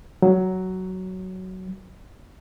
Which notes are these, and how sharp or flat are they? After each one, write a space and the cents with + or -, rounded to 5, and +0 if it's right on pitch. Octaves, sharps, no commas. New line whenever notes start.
F#3 +10